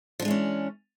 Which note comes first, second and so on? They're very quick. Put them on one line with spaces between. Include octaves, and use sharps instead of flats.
F3 D4 G#3 E3 C#4